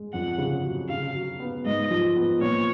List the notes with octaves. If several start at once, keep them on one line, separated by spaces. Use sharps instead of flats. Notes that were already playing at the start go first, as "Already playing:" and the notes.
Already playing: G#3
F2 F#5
C#3
F#3
C#3 F5
F#3
B3
G#2 D#5
F3
B3
A#2 C#5